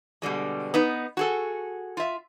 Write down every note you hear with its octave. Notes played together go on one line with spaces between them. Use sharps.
B2 D3 G3 G#3
B3 D#4
F#4 G#4 A4
F4 E5